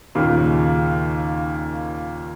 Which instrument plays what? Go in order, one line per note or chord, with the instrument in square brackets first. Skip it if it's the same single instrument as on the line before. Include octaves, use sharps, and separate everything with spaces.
[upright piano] D#2 A#2 C#3